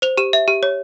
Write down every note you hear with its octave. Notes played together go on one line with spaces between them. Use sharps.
C5 F7
G4 E7
E5
G4
C#5